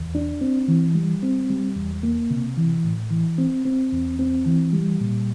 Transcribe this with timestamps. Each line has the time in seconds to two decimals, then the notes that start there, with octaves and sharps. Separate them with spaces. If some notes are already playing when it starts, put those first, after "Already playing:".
Already playing: E2
0.15 D4
0.41 C4
0.68 E3
0.95 G3
1.23 C4
1.50 G3
1.76 E2
2.03 A#3
2.31 C3
2.57 E3
2.84 A2
3.11 E3
3.38 C4
3.65 C4
3.92 E2
4.19 C4
4.46 E3
4.73 G3
5.01 A#2